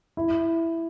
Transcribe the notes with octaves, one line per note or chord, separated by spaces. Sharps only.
E4